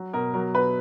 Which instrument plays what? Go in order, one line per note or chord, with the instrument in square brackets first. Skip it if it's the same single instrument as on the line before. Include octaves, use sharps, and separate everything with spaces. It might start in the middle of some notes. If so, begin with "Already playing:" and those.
Already playing: [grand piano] F#3
B2 A#4
F#3 A#4
B2 B4